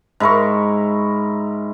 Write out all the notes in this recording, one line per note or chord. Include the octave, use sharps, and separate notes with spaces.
G#2 E4 A#4 C#6